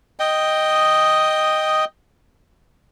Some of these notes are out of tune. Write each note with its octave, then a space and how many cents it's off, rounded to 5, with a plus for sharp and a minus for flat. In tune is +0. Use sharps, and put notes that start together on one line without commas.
D#5 +0 G5 +0 D#6 +0